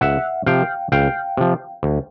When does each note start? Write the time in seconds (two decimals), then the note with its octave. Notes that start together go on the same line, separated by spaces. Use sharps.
0.01 C#2 E5 F#5
0.46 C3 F3 F5 G5
0.92 C#2 F5 G5
1.37 C3 F3
1.83 D2